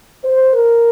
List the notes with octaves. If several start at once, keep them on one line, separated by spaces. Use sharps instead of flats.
C5
A#4